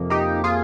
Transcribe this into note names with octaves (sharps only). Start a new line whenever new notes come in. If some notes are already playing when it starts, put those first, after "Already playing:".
Already playing: F2 C3 F3 A#3
D#4 G4
F4 G#4